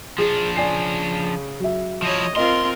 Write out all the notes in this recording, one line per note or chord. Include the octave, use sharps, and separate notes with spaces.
F3 D4 G#4
C#3 D5 G#5 C7
F#3 E5
F3 E4 C#5 D#5
C4 F4 A#4 D#5 C6